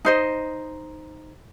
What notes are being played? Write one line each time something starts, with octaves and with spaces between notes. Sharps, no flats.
D#4 C5 D#5